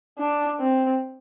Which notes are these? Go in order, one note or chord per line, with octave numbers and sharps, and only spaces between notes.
D4
C4